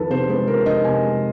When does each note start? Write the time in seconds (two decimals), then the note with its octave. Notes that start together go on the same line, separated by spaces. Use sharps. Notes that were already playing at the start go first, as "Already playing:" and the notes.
Already playing: F2 D#3 A4 B4
0.10 C3 C5
0.29 G#3 B4
0.48 F2 A#4
0.66 D#3 D#5
0.84 C3 G#5
1.03 G#3